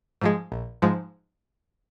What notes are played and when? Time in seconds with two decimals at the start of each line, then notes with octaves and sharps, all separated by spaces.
0.21 G#2 F3 G#3
0.52 A#1
0.82 G#2 F3 G#3